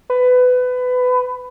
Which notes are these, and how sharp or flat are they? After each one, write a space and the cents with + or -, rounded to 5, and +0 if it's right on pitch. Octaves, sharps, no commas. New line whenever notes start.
B4 +20